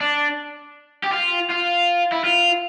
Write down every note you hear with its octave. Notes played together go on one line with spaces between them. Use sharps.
D4
G4
F4
F4
E4
F4